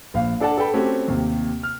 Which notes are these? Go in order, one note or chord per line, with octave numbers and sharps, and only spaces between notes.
A#1 F5
D4 A4 D5 F#5 A5
A4 B4 G5 B5
A3 C4 C#4 F#4 G4 A4
D#2 C3
F6